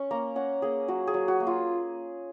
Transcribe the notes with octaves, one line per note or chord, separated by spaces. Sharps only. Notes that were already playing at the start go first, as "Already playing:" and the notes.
Already playing: C#4 C#6
A#3 A#5
C#4 F#5
A#3 G#4
F#3 F#4
G#4
F#3
F#4
A#3
F4